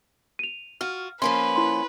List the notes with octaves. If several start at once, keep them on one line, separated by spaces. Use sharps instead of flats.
D#7 F7
F4 F#4 F6
F3 A#3 C#4 B4 C6
E4 C6